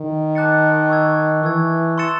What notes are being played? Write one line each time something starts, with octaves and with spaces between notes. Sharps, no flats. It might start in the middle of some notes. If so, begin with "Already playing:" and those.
Already playing: D#3
A5 D6 F#6 A6 C#7
C#6 E6 G#6
E3 C#6 E6 G#6
C6 E6 A6 C#7 E7